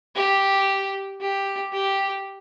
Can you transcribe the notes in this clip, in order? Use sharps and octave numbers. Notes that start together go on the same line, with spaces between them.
G4
G4
G4